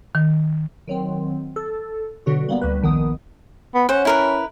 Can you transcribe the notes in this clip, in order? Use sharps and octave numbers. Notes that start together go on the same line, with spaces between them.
D#3
D#3 F#3 C4
A4
B2 D3 F#3 F#4
G3 A#3 B3
D2 G3 B4
A#1 D#3 B3 D#6
B3
C#4 C5 F#5
E4 A#4 B4